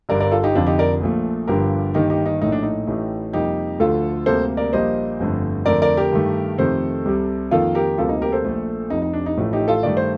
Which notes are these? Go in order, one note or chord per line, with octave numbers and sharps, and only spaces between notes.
G1 G2 D3 A#4 D5
A#4 D5
F4 A4
D#4 G4
F1 F2 D3 F3 D4 F4
D#4 G4
A#4 D5
A#1 A#2 F3 A3
G1 G2 D3 F3 G4 A#4
G1 G2 D#3 A#3 D#4 G4
D#4 G4
D#4
A#1 A2 A3 D#4
D4
D#4
A1 A2 A3
F2 C3 G3 A#3 D#4 G4
D2 D3 F3 A3 F4 A4
D2 C3 G3 A#3 A4 C5
A#4 D5
A#1 A#2 G3 A#3 C5 D#5
G1 F2 D3 A3
F2 D3 A3 A#4 D5
A#4 D5
G4 A#4
G2 D#3 A3
F2 C3 D#3 A3 A4 C5
C2 C3 G3
F2 D#3 A#3 F4 A4
G4 A#4
D2 C3 G3 A#3 F4 A4
D#4
G4 A#4
A4 C5
A#1 A#2 A3
F1 F2 C3 D#4
D#4
D4
D#4
A1 A2 F3 A3
D#4 G4
F4 A4
G2 D#3 A3 D5
C5